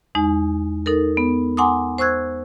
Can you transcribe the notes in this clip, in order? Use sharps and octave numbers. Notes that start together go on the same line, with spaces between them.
E2 G#3 D#4
D#4 A4 A#4
B3
F#5 G#5 A#5 C6 D6 D#6
C5 C#6 E6 F#6 G#6